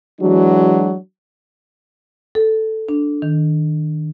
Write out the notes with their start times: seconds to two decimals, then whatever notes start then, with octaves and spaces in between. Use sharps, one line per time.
0.21 E3 F#3 G#3 D4 F#4
2.35 A4
2.89 D4
3.22 D#3